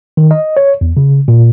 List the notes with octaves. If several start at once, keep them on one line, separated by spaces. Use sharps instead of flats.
D#3
D#5
C#5
E2
C#3
A#2